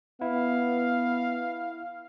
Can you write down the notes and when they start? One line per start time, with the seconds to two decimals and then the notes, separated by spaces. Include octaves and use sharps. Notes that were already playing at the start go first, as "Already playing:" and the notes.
0.21 B3 E4 F5